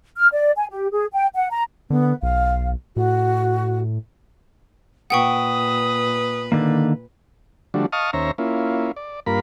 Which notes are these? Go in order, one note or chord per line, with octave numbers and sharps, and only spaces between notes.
F6
D5
G#5
G4
G#4
G5
F#5
A#5
D3 B3
B1 F5
A2 F#4
A#2 B4 F#5 G5 C#6 D#6
D3 D#3 A#3
D3 F3 G3 A3 D4 F#4
D#5 F5 A5 C#6 D#6 F6
D#2 C#4 C5 C#5 E5 A#5
A#3 C#4 E4 F4
D5
G2 A#3 F4 A#4 B5